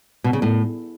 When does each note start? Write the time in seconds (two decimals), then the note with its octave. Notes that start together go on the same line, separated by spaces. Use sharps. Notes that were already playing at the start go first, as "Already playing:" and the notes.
0.24 B2
0.33 C#3
0.42 A2